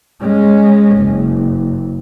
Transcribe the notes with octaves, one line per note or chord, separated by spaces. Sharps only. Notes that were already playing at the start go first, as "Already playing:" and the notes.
G#3 C#4
F#1